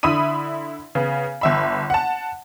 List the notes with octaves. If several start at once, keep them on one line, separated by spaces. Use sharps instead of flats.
D3 E4 E5 B5 D#6 D#7
C#3 B3
G1 E5 B5
F#5 A5